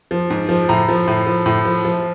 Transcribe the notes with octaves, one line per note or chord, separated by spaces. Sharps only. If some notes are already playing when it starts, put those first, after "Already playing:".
F3
G#2
F3
A2 A#5
F3
A2
F3
A2
F3
F3